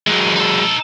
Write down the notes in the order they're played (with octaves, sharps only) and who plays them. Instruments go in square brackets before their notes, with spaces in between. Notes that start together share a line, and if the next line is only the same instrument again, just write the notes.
[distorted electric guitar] E3 D#4 [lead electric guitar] F#3 G#3
[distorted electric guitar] D#4 A4